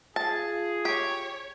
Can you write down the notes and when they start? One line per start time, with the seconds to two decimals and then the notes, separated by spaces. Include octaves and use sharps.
0.16 F4 G#4 A5
0.85 G4 C#5